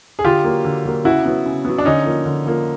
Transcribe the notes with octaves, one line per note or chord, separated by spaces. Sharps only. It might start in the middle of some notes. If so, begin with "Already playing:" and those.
G#4
D3 F4 G4
F#3 A#3
D3
F#3 A#3
C#3 E4 F#4
F#3 B3
C#3
F#3 B3
D4
D3 C#4 D#4
F3 A#3
D3
F3 A#3